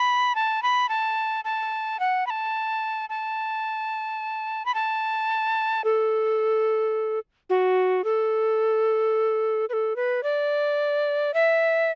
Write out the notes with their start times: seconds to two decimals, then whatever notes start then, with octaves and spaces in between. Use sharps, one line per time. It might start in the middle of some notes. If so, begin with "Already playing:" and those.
Already playing: B5
0.35 A5
0.63 B5
0.89 A5
1.45 A5
2.00 F#5
2.27 B5
2.30 A5
3.09 A5
4.66 B5
4.74 A5
5.84 A4
7.50 F#4
8.04 A4
9.69 B4
9.73 A4
9.96 B4
10.23 D5
11.34 E5